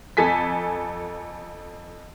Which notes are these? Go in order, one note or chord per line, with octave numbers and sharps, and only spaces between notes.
F2 A4 G#5 B6